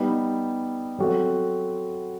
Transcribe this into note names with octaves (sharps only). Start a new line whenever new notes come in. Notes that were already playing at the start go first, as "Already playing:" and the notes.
Already playing: G3 B3 D#4
F#3 C4 F#4 A4